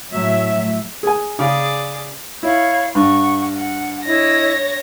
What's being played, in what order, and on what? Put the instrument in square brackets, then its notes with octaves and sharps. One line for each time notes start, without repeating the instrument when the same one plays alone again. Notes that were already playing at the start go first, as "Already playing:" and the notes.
[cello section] A2 F#3 E5
[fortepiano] G#4 G#5
[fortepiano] C#3 [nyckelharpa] G#4 D5
[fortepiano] E4 [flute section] C#5 F5 B5
[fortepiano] G2 [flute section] F#5 C#6
[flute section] F#5
[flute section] E4 D#5 [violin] C#5 A#6